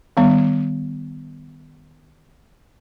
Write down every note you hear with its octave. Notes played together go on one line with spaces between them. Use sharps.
D#3 G3 B3